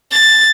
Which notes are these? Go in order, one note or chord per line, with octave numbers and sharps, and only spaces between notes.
A6